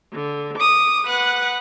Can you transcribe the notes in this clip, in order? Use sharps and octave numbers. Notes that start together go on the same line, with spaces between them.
D3
D6 D#6
B4 F#5 F#6